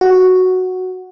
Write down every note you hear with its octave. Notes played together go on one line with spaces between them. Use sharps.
F#4